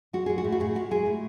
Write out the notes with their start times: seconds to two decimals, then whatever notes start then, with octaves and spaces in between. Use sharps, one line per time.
0.13 G#3 F#4
0.26 G#3 G#4
0.38 F#4
0.44 A2
0.52 F#4
0.60 A2 G#4
0.75 G#3 F#4
0.91 G#3 G#4
1.06 A2